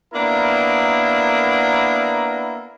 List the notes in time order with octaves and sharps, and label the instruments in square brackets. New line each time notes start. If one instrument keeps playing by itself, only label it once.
[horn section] A#3 B3 D4 E4 A#4